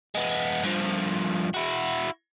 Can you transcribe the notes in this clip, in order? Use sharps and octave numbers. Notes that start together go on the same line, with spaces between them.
G#3 B3
G2 F3
E4 F#4